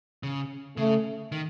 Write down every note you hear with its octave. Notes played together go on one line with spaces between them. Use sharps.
C#3
C#3 A3
D#3